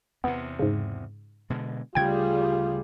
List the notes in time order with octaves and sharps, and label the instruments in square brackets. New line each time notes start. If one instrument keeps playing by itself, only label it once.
[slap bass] E2 C3 [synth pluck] B3
[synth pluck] G#2 C#3
[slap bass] B2 D3 G#3
[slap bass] D2 C#3 A3 [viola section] G3 G#4 [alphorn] F4 [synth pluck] G5 G#6